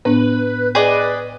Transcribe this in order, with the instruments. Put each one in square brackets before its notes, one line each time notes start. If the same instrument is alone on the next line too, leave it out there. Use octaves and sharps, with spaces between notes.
[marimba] A2 B3 D4 [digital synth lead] B4
[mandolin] G#4 D5 D#5 [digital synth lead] B4